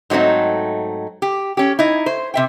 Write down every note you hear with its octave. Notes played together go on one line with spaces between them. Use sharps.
G#2 F#3 A3 C4 D#4
G4
C#4 G4
D#4 E4
C5
C3 E5 G5